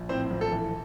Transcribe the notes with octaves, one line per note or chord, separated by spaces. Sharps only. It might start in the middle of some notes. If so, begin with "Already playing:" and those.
Already playing: A#1
A2 C4 C5
A#1
A4
E3